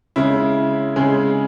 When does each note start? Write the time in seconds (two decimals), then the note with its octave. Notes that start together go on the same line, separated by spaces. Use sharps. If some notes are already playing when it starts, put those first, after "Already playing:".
0.16 C#3 G#3 E4
0.96 C#3 G#3 G#4